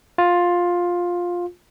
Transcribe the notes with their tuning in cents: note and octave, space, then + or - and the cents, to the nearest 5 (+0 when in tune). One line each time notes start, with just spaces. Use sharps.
F4 +10